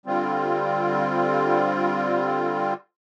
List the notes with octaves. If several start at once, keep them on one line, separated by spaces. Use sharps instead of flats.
D3 G3 C4 F4